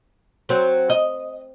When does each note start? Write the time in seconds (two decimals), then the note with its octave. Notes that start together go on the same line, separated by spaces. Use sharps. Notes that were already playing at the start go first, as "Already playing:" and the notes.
0.49 F#3 C4
0.90 D#5